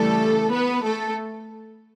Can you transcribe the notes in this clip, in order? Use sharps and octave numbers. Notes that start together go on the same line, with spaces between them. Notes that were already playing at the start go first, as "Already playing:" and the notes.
Already playing: C#3 E3 G3 A3 A4
B3 B4
A3 A4